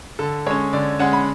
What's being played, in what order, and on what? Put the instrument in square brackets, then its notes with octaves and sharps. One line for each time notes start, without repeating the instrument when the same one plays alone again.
[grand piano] D3 A4
G#3 C#5
C#4
D3 D5
G#3 C#4 F#5
B5